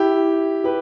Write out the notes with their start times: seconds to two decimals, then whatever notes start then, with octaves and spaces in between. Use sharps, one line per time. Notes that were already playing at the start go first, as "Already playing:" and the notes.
Already playing: E4 G4
0.64 G4 B4